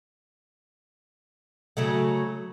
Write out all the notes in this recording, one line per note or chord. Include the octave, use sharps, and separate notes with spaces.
C#3 F#3 A3